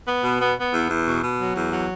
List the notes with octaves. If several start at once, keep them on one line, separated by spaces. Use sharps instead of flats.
B3
B2
B3
B3
E2
E2
B2
B2
F#3
E2
F#3